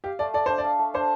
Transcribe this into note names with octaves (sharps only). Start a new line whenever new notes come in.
G4 F5
A3 D5
A4 D5
D4 C5
D5
F5
A3
D4 C5